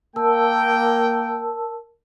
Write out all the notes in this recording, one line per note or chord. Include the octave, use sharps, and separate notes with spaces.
A#3 A#4 G5 A5 E6